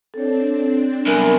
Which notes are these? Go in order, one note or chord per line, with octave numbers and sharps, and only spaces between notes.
C4 D4 A4 C#5
C2 F#3 B3 A#4 G#5